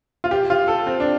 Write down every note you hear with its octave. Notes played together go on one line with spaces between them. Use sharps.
F4
G4
F4
A4
C4
D4